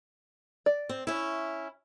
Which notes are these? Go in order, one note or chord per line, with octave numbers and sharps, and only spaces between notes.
D5
C4
C#4 E4